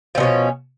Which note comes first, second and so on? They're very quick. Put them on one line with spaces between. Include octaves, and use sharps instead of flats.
F3 D3 B2 C#4